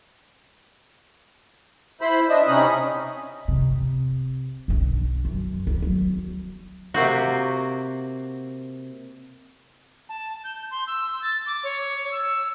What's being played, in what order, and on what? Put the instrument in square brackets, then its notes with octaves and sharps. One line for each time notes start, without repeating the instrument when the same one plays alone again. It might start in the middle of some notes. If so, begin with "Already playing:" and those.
[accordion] E4 C5 B5
D4 D#5 E5
C3 C#4 D#4 B5 D#6
[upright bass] C3
B1 D4
F#2
D2
F#3
[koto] C3 A#3 C4 F#4
[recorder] A5
G6
C6
E6
A6
D6
C#5
E6